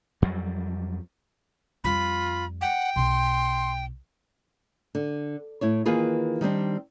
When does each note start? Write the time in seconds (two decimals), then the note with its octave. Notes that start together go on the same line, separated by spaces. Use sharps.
0.22 F2 F#3 G3
1.84 F2 G3 F4 B5
2.61 F#5 G5
2.96 B1 B2 C6
4.95 D3
5.61 A2 E4 C#5
5.86 D#3 E3 A#3 F4 G#4 B4
6.41 D#3 G3 C4 D4